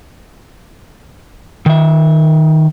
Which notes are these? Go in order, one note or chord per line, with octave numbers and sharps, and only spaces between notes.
D#3 E5